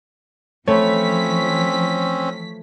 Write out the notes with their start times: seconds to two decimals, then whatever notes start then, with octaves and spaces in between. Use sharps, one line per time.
0.68 E3 F3 A3 C4 C#4 C#5 B5 B6